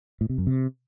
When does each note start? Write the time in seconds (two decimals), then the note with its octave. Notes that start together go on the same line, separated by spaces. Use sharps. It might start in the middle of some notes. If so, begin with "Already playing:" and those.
0.21 A2
0.29 C3
0.38 F#2
0.47 C3